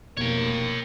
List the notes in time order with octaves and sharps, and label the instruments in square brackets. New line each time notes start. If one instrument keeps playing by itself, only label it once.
[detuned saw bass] F1 [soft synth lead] B2 [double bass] A#3 [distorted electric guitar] C#5 G5